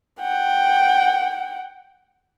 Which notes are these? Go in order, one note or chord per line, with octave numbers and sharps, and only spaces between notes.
F#5 G5